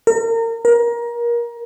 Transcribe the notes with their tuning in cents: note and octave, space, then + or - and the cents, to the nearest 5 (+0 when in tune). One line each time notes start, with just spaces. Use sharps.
A#4 -30
A#4 +25